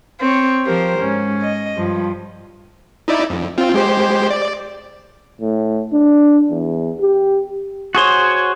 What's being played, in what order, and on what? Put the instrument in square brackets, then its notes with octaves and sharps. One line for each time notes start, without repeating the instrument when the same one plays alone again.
[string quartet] C4 C#5
F3 G4 A#4 C5
G#2 C#4
D#5
G2 F3
[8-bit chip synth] D#4 E4 D5
F2
C4 F4
G#3 G4 C5
D5
[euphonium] A2
D4
E2
G4
[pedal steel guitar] F#4 G#4 C5 C#5